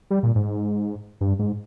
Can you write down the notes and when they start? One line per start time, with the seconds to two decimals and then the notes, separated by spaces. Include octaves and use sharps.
0.10 G3
0.23 A#2
0.35 G#2
1.21 G2
1.39 G#2